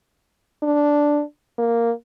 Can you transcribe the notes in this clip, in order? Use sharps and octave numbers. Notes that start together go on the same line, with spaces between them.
D4
A#3